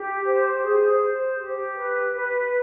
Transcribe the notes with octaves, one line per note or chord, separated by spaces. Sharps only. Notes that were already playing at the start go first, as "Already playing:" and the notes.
Already playing: G4
C5
G#4
C5
G4
B4
B4